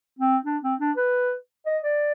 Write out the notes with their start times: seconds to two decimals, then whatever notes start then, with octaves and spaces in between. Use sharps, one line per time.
0.19 C4
0.45 D4
0.63 C4
0.79 D4
0.97 B4
1.66 D#5
1.83 D5